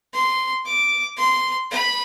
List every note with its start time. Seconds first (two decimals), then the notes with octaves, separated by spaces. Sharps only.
0.14 C6
0.66 D6
1.17 C6
1.71 B5